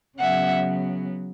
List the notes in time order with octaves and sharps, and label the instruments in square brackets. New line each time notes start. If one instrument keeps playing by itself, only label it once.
[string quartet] C#3 F#3 B3 E5 F#5